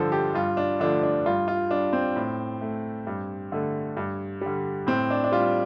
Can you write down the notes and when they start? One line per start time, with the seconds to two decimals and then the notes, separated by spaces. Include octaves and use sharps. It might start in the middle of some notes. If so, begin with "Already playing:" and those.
Already playing: G2 D3 F3 A4 C5
0.12 G4
0.34 G2 F4
0.57 D4
0.80 D3 F3 A3 D4
1.03 D4
1.26 G2 F4
1.48 F4
1.70 G3 D4
1.93 C4
2.16 A2
2.61 A3
3.07 G2
3.52 D3 A3
3.97 G2
4.41 D3 G3
4.87 A2 C4
5.10 D4
5.24 D4
5.32 G3 F4